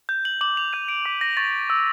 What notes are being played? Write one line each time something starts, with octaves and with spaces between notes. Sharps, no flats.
G6
F#7
D6 F#7
F7
G6 D#7
D7
D6 B6
A#6
C#6 A6
E6